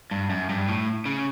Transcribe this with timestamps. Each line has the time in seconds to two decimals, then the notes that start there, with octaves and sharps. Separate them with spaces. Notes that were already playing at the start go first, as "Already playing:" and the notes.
0.11 G2
0.30 F#2
0.50 G2
0.68 A2
1.05 C#3